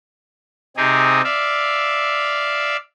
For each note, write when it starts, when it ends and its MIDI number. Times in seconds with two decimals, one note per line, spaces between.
0.77 1.21 48
0.77 1.21 60
0.77 1.21 63
0.77 1.21 67
0.77 1.21 68
1.24 2.77 74
1.24 2.77 76
1.24 2.77 77